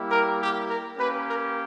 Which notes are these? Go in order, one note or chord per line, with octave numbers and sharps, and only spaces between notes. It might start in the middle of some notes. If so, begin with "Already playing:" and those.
Already playing: G3 A#3 E4 G4
A#4
G4
A#4
A#3 C#4 G4 B4
A#4